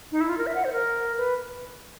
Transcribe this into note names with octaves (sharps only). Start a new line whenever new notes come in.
D#4
E4
F4
A#4
E5
F#5
C5
A#4
B4